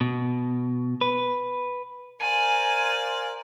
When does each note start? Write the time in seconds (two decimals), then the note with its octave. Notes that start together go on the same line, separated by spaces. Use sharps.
0.01 B2
1.01 B4
2.22 A#4 C5 D5 F5 G#5 D#7